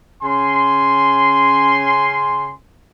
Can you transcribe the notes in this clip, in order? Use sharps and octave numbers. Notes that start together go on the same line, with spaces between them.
C#3 C#4 G#5 C6